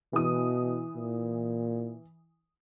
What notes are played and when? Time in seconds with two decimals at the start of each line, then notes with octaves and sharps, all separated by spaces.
0.13 B2 E3 D#6
0.96 A#2